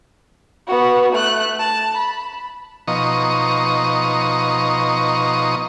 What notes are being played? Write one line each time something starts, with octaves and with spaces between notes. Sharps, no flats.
B3 F#4
A3 F#6
A5
B5
B2 F3 D#4 D#5 A#5 C#6